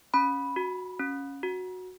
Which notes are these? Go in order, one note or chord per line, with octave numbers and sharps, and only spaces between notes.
C#4 B5
F#4
C#4
F#4